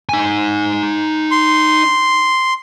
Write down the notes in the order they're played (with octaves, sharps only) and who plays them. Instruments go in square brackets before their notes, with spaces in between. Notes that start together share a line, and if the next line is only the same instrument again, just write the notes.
[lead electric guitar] D#4 G#5
[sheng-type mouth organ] C6